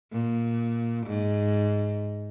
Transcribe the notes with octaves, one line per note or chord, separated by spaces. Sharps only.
A#2
G#2